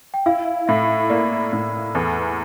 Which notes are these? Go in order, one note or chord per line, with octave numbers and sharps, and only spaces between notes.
G5
E4 F5
A2 E5
A#3 D5
A2
E2 A4